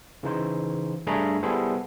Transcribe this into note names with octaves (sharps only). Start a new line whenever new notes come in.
C#3 E3 D#4 C5
G2 A3 D4 G#4 A#5 B5
G3 B3 E4 G#4 A4 C5